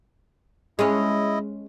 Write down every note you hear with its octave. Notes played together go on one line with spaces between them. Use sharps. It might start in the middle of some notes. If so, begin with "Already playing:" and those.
G#3 C#4 E4 D#5